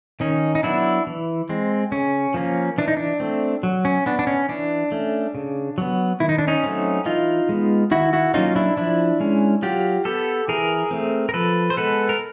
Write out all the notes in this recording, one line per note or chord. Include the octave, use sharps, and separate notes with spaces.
D#3 C#4 D#4
D#4
F#3 B3 D4 E4
E3
G#3 C4
C#3 C#4
F3 A#3 C#4
E3 D4
D#4
D4
A3 C4
F#3
C#4
B3 D4
D4
C#4
E3 D4
A3 C#4
C#3
F#3 B3
D#3 E4
D#4
D4
C#4 D#4
F#3 A3 C4
E3 D#4 F4
G#3 B3
D#3 E4 F#4
E4 F#4
F#3 A#3 C#4 D#4 F4
D4 E4
F3 D4 E4
G#3 C#4
F#3 F4 G4
B3 G4 A4
E3 G#4 A#4
A3 C4
A#4
F3 A4 B4
C5
G#3 B3 A4 B4
A#4